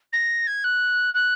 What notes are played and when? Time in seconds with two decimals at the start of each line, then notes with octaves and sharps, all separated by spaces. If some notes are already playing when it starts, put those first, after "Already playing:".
0.13 A#6
0.47 G#6
0.64 F#6
1.14 F#6